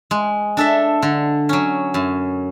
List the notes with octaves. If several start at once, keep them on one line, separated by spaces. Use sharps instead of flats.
G#3
D4 A4 E5
D3
F#3 C#4
F#2